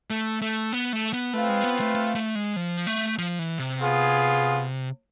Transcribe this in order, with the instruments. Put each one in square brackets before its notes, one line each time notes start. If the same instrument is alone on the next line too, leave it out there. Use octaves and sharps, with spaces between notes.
[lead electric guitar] A3
A3
B3
A3
B3
[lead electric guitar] A3 [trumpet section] C4 F4 B4 F5
[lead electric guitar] G#3
B3
A3
A3
A3
G#3
F3
A3
F3
E3
C3
[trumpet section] B3 F4 G#4